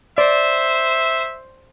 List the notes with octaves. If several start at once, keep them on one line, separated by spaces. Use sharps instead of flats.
C5 D5 E5